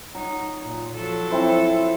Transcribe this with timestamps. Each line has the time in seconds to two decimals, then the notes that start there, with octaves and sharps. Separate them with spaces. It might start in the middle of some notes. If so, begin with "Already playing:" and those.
0.15 F#3 D#4
0.64 A#2
0.96 F3 F#3 A4
1.30 C4 E4 C5